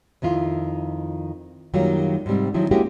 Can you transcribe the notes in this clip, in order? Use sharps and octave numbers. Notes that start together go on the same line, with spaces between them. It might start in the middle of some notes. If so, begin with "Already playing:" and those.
F2 D#3 E4 F4
F#2 D#3 F#3 G3 A#3 F4
G#2 C3 G3 C4
D#3 F3 F#3 E4
G#3 A#3 C#4 E4 F#4 G4